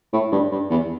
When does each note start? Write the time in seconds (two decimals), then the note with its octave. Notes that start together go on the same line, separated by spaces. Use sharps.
0.13 A2
0.32 G2
0.51 G2
0.70 E2